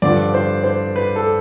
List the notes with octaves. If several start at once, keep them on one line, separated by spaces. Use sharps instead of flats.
G2 D3 F3 D5
C5
C5
B4
A4